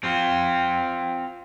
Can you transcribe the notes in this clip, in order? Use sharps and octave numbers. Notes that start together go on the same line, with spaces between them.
C4 F4